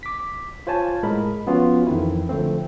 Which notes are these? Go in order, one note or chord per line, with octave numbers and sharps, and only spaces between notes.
D6 B6
F4 C5 C#5 G#5 A5
A2 G#3 A#4 B5
F3 B3 C#4 F4 F#4
F2 D#3 E3 C4 E4
D3 F3 A3 C4